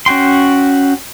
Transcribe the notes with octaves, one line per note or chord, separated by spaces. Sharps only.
C#4 F#4 G5 C6